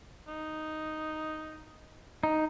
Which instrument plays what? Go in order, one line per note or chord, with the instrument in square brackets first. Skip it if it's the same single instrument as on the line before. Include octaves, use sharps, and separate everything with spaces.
[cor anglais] D#4
[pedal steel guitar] D#4